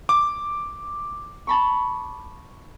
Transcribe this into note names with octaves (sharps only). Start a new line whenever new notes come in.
D6
A5 B5 C#6